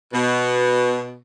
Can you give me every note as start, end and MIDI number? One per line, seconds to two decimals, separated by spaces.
0.14 1.18 47